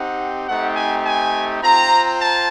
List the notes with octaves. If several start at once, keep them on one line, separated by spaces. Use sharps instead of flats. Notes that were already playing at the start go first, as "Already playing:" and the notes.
Already playing: C4 D#4 G4 F#5
A3 C4 D#4 G4 F#5
G#5
G#5
C4 F4 A#5
A5